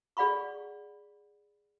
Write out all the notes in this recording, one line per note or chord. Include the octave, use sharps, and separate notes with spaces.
G#4 D5 F#5 B5 C#6